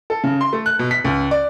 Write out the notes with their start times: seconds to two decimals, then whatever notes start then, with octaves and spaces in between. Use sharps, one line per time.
0.10 A4
0.24 C#3
0.41 C6
0.53 A3
0.66 F#6
0.79 B2
0.91 B6
1.05 C#2
1.31 D5